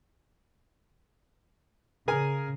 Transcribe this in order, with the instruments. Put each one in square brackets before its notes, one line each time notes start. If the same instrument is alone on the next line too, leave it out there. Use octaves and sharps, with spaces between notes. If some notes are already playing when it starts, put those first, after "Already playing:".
[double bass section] C#3 [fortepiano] G#4 A#4 G#5